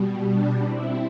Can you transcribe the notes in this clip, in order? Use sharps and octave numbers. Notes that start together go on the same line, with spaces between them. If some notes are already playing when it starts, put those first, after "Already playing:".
Already playing: B2 G3
D4
C4 E4